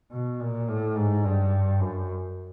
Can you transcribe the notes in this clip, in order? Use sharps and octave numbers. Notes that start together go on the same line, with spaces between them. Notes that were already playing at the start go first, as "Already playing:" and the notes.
B2
A#2
A2
G#2
G2
F#2